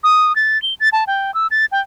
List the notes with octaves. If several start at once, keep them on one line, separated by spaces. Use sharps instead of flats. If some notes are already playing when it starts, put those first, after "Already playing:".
D#6
A6
G7
A6
A5
G5
E6
A6
G5